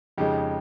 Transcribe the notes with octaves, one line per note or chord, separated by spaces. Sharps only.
F2 C#3 G#3 D#4 G4